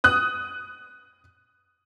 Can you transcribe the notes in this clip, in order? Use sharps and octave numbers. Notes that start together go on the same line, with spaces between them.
D#6 F#6